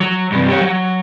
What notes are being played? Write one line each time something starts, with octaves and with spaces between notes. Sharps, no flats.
F#3
G2 C3
G4 C#5
F#3